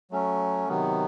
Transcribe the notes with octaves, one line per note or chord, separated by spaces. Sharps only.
F#3 A3 C#4
C3 D#3 F#3 B3